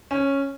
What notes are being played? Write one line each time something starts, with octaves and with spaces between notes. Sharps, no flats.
C#4